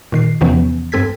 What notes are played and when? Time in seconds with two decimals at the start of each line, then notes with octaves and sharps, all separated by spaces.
0.12 A#2 D#3 C7
0.41 E2 C3 E3 F3 B3 C#4
0.92 G2 C4 A4 G#6 B6